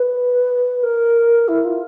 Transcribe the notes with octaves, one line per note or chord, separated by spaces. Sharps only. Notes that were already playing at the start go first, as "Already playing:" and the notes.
Already playing: B4
A#4
E4
F4